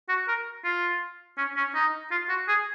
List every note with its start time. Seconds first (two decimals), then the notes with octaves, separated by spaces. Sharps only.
0.09 F#4
0.28 A#4
0.64 F4
1.37 C#4
1.56 C#4
1.75 D#4
2.11 F4
2.29 F#4
2.48 G#4